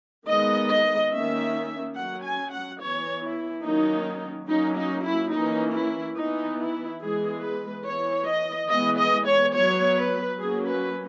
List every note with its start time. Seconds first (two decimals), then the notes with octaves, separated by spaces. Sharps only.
0.27 D#3 G#3 B3 D#5
0.69 D#5
1.11 D#3 A#3 C#4 E5
1.96 F#3 C#4 F#5
2.23 G#5
2.51 F#5
2.80 E3 B3 C#5
3.22 E4
3.64 D#3 F#3 A#3 C#4 D#4
4.48 F#3 A#3 C#4 D#4
4.76 D#4
5.04 E4
5.33 E3 A#3 C#4 D#4
5.74 E4
6.16 E3 B3 D#4
6.60 E4
7.01 E3 G#3 B3 G#4
7.43 B4
7.85 E3 B3 C#5
8.27 D#5
8.69 E3 G#3 B3 D#5
8.97 D#5
9.26 C#5
9.53 F#3 B3 C#5
9.96 B4
10.38 F#3 A#3 C#4 G#4
10.67 B4